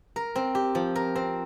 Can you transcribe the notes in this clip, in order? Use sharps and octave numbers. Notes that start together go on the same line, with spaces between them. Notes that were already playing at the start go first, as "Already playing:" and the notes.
A#4
C4
G4
F3
A#4
C4